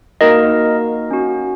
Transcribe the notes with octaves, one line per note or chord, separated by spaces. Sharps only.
A#3 D#4 F#4 A#4 D#5
C#4 F#4